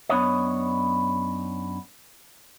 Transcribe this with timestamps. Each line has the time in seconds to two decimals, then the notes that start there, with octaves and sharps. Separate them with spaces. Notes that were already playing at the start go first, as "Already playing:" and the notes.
0.09 F#2 B3 D4 C#5 D#5